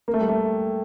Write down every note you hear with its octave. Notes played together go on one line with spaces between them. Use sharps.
A#3
A3
G3
A3